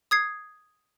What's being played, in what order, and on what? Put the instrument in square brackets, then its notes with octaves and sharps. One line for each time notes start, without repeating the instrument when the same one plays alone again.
[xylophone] D#6 G#6 C7